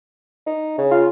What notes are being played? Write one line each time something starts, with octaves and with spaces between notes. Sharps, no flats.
D#4
C#3
F4